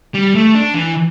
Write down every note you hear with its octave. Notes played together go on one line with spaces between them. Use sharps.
G3
A3
D4
E3